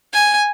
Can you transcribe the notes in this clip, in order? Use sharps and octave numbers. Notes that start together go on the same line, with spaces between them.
G#5